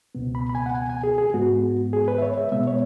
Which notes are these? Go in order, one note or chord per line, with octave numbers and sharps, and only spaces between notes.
C#2 B2 B3
B5
B5
G#5
F#5
G#5
G#5
G#4
G#4
G#2 G#3 B3 F#4
G#4
B4
E5
C#5
E5
B2 G#3 B3 E5
C#5